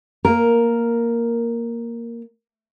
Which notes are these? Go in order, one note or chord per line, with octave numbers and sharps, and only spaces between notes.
A#3 A#4